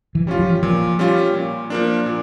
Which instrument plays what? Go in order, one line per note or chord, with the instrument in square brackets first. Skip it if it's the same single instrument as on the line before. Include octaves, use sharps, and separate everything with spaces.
[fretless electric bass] E3
[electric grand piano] G3 C#4 F4
[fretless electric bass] F3
[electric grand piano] A#2 [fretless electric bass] F3
[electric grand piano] G3 C#4 F4
A#2
F3 A#3 D4
A#2